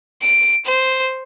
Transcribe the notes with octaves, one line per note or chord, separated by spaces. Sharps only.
D7
C5